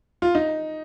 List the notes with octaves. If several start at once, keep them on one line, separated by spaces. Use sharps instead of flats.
F4
D#4